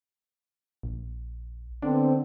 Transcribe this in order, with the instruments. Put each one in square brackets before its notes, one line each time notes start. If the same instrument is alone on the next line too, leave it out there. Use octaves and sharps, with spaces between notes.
[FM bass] A#1
[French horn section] D3 B3 C4 [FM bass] D4